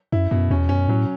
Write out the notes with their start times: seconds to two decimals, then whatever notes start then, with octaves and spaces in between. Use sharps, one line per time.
0.12 F#2 E4
0.31 F#2 B2
0.50 E2 C#4
0.69 F#2 C#4
0.88 A2 F#3